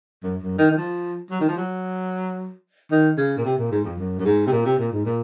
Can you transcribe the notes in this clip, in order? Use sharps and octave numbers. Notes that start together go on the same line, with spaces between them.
F#2
F#2
D#3
D#3
F3
F#3
D#3
F3
F#3
D#3
C#3
A#2
C3
A#2
G#2
F2
F#2
F#2
G#2
C3
A#2
C3
A#2
G#2
A#2